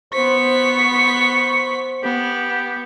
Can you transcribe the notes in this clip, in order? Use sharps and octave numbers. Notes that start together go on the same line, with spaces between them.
B3 C5 C#6 B6
B3 G4